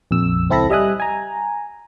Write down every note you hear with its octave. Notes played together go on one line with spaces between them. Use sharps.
A#1 F2 E6
C#2 C4 E4 A4 B5 A#6
G3 D#5 E5 G#5 D#6 F#6
G#5 A#5